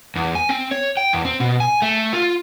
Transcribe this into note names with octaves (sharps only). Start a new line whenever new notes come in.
E2
G#5
C4
C#5
G5
E2
C4
B2
G#5
A3
F4